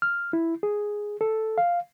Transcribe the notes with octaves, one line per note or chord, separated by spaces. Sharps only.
F6
E4
G#4
A4
F5